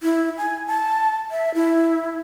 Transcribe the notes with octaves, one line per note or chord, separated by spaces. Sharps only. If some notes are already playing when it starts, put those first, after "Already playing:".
E4
G#5
A5
E5
E4